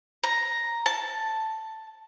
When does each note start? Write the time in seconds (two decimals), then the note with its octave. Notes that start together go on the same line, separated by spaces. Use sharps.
0.24 A#5
0.86 A5